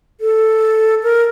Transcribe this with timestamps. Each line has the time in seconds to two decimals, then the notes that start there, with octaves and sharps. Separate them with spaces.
0.21 A4
1.03 A#4